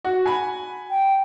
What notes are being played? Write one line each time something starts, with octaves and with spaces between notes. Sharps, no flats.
F#4
G#5 B5
G5